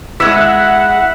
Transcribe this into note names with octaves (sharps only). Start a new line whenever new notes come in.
G#3 E4 E5 F#5